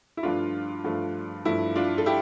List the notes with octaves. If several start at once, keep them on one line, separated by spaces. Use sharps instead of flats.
E4
G2 F3 A3 D4 F4
G2 F3 A3
G2 F3 A3 E4
D4 F4
A4
E4 G4